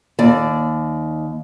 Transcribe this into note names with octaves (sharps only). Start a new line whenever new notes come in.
D#2 D5